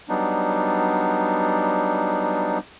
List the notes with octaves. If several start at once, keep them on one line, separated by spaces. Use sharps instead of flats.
F#3 G3 B3 D4 D#4